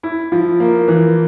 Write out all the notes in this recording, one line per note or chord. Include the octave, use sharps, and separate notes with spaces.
E4
F3
A#3
E3